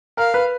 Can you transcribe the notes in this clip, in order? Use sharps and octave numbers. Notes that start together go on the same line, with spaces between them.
A#4 F5
B4